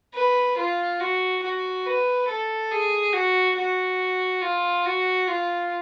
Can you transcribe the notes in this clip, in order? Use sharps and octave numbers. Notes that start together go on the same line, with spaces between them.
B4
F4
F#4
F#4
B4
A4
G#4
F#4
F#4
F4
F#4
F4